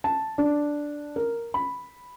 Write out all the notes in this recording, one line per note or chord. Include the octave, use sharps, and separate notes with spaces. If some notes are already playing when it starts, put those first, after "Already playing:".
A5
D4
A#4
B5